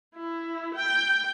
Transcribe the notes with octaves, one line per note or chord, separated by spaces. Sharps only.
E4
G5